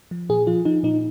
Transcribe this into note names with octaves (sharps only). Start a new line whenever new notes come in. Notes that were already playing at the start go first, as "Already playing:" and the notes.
F3
A#2 G#4
F3 F4
F3 D#4
A#2 D#4